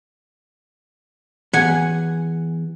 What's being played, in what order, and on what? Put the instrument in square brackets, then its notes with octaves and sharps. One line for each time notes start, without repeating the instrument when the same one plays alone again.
[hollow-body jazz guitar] E2 [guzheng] F#5 G#5